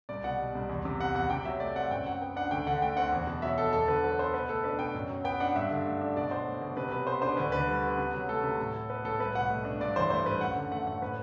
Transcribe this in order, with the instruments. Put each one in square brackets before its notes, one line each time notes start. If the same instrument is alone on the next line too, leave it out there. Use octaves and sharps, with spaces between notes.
[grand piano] C2 D5
B2 F#5
G3
C2
E2
C3
G3 F#5
E2 F#5
C3 G5
F#3 E5
A3 D5
C4 F#5
F#2 G5
F#3 F#5
B3 G5
D4 F#5
D2 G5
D3 F#5
A3 G5
C4 F#5
E2
B2
F#3 E5
E2 A4
E2 A4
D3 B4
F#3 B4
B3 C5
B2 B4
A3 A4
D4 B4
B2 G5
F#2
F#3
B3 G5
D4 F#5
G2 E5
D3
A3
D4
B2 D5
F#3 C5
A3
B2
C3 B4
F#3 B4
B3 C5
D4 C5
D2 B4
D3 B4
G3
B3
C3
F#3
A3 A4
C3
A2
F#3
B3 B4
A2 A4
C2 B4
B2 F#5
A3
D4
G2 D5
E3 C5
A3 C5
G2 B4
F#2 F#5
D3
A3 F#5
F#2 F#5
A2 B4